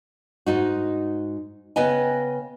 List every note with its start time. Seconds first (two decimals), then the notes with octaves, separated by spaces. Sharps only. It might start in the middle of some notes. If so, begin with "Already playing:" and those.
0.46 G#2 D#4 F#4
1.76 C#3 B3 B4 D#5 G5 G#5